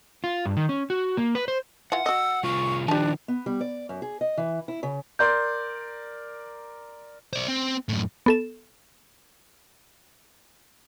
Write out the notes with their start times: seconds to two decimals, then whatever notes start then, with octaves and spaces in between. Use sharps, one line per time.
0.24 F4
0.45 G2
0.57 D#3
0.69 C#4
0.90 F#4
1.17 A#3
1.35 B4
1.48 C5
1.92 E3 F4 E5 F#5
2.06 F#4 D#5 E6
2.43 C2 F4 C#6
2.88 D#3 F3 D4 G4 A5
3.28 B3
3.46 G3
3.61 D5
3.89 F#2
4.02 G#4
4.21 D#5
4.37 E3
4.68 E4
4.83 C#3
5.19 A#4 D5 C6 G6
7.33 C5 D5
7.48 C4
7.89 F#2 A2
8.26 B3 A4 E7